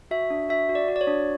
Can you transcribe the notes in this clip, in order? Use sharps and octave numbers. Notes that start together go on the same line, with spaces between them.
F#4 E5
D4
F#4 E5
F#4
D5
F#4
D5
C#5
D4